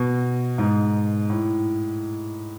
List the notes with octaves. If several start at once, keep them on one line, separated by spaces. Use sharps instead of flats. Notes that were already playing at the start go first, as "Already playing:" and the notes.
Already playing: B2
G#2
A2